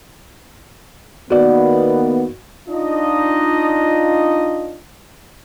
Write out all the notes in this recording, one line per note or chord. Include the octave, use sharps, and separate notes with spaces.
D#3 A#3 B3 F#4 D5
D4 D#4 F4 D#5